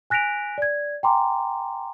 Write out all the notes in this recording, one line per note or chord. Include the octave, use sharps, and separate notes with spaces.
G#5 F#6 A#6 B6 D7 F7
D5 G#6
G5 G#5 A#5 C6 D6